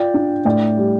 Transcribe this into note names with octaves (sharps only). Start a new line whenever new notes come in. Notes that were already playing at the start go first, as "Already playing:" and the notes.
Already playing: F4 D5 G5
D4
A2 D5 G5
G3